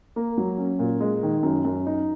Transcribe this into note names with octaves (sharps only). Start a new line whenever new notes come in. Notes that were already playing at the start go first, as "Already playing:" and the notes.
A#3
F#3
C#4
A#2
G#3
D#3
F#2
F#2
D#4